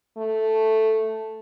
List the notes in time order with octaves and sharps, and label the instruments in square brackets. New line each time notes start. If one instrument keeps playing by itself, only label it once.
[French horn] A3